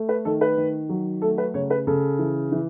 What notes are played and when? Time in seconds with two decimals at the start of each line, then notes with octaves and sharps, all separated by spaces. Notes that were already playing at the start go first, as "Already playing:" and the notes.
Already playing: A3
0.09 B4
0.25 D#3 A4
0.41 B4
0.57 D#3
0.89 F#3
1.22 A3 A4
1.38 B4
1.54 C#3 C#5
1.70 B4
1.87 C#3 A4
2.19 E3
2.52 E3